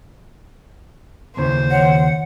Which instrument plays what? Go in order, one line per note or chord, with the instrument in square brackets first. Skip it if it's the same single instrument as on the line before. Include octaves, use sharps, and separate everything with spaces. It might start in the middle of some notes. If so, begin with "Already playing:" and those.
[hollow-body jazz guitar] D#2 C#3 E3 [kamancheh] C5
[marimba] D#3 C#5 [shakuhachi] F#5